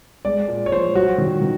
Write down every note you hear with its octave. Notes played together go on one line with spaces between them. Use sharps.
G#3 D5
A#2
C#5
F3 C5
F#3 F#4
D#3
D#3